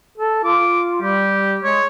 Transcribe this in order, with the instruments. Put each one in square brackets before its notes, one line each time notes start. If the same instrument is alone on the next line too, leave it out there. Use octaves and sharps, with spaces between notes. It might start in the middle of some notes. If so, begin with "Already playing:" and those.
[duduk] A4
[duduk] F4 [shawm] D6
[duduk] G3 [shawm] G4
[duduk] G#3 [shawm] C#5